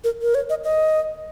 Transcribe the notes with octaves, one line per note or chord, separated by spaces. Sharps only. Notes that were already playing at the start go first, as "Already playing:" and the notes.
A#4
A#4
C#5
D#5
D#5